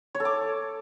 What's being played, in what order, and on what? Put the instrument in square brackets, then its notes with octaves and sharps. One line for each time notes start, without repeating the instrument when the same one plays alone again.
[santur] C#5
A4
D6